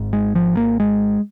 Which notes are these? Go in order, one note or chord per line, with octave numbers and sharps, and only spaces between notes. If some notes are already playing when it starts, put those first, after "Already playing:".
Already playing: G#1 G#2
G#3
F3
A#3
G#3